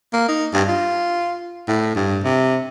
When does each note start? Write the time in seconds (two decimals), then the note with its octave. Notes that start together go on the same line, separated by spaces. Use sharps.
0.13 A#3
0.28 D#4
0.53 G2
0.68 F4
1.68 A2
1.96 G2
2.24 C3